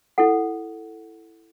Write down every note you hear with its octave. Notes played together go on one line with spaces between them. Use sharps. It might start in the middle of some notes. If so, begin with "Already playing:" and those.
E4 A4 F#5